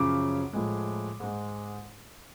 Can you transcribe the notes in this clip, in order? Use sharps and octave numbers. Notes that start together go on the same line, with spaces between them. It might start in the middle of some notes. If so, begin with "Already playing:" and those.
Already playing: F#2 C#3 F3 D6
A2 F3 G#3
G#2 G#3